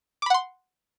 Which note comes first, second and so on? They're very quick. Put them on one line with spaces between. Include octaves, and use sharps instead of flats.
D6 B5 F#5 C6